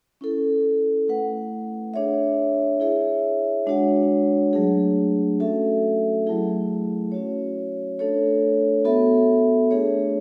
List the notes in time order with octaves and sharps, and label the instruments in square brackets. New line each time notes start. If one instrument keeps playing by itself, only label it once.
[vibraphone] C#4 E4 A4
A3 E4 B4 F#5
D4 G#4 C#5 E5
E4 G#4 C#5 E5
G#3 D4 F#4 C#5 F#5
F#3 A3 D4 G#4
A3 C#4 F#4 A4 E5
F#3 A3 E4 G#4
C#4 F#4 C#5
A3 D4 A4 C#5
B3 F#4 A4 E5
A3 D4 G#4 C#5